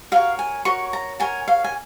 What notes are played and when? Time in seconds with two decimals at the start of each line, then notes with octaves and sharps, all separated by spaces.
0.12 F#4 A#4 C#5 F5
0.39 G#5
0.65 F#4 A#4 C#5 C#6
0.93 A#5
1.20 F#4 A#4 C#5 G#5
1.48 F5
1.64 G#5